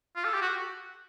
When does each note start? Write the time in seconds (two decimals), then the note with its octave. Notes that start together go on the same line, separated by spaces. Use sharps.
0.16 F4
0.24 A4
0.34 G4
0.42 F#4